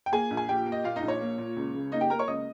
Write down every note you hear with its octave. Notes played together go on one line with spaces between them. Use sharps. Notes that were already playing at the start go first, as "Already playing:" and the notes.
G5
A#3 G#4 G#5
A#1
G#5
A#2 G4 G5
A#3
D#5
A#2 F4 F5
D#4 D#5
A#1
C#5
A#3
A#2
C#2
C#3
A#3 D#4 D#5
G4 G5
A#3 A#4 A#5
C#5 C#6
C#2 D#5 D#6